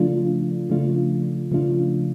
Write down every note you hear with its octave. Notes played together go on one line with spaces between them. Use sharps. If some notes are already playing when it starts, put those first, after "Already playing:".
Already playing: C#3 F3 A3 D4 F4
C#3 F3 A3 D4 F4
C#3 F3 A3 D4 F4